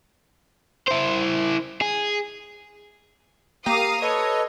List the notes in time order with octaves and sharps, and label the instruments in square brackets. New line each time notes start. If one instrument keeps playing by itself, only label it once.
[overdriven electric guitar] E4 C5
G#4
[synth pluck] A#3 G4 [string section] F5 D#6 [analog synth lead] A#5
[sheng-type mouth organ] A4 B4 [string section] C#5 [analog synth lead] D#5